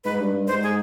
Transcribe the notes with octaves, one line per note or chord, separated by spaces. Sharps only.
G#2 B4
G2
G2
G#2 C5
G#4